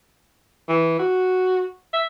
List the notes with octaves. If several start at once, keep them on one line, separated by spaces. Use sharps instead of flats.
E3
F#4
E5